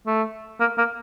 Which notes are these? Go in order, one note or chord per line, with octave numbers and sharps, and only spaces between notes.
A3
A#3
A#3